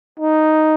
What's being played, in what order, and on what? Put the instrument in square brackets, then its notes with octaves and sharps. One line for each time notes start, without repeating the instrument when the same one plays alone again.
[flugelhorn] D#4